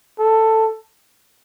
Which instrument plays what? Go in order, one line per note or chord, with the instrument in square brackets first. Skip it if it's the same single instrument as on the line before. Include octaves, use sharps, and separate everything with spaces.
[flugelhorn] A4